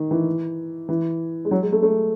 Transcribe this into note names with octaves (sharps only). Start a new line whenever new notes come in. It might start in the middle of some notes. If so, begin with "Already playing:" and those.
Already playing: D#3
E3
E3
G#3
F#3
G#3
A3
A3